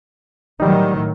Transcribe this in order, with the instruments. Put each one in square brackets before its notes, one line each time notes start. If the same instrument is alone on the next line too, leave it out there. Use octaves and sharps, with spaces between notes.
[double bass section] A2 D#3 F#3 [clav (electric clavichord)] G3 D#4